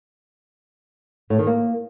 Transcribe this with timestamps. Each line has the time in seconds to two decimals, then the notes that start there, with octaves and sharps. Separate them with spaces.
1.30 A2
1.39 D#3
1.47 A#3